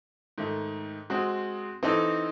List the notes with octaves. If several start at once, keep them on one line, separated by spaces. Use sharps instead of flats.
G#2 D#3 A3
G#3 C4 F#4
E3 C4 D#4 A4